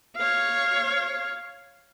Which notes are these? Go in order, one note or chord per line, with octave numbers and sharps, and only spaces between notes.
C#5 F5